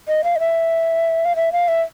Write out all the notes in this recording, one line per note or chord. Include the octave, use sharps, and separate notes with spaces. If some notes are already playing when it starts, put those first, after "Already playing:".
D#5
F5
D#5
E5
F5
E5
F5
E5